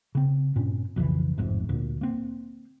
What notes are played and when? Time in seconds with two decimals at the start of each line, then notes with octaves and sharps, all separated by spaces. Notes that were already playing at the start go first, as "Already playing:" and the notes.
0.15 C#3 C4
0.56 G2 A#2 C4 C#4
0.96 B1 F2 C#3 E3
1.38 A1 F2 G#2 C3
1.69 D2 A#2
2.01 A#3 C4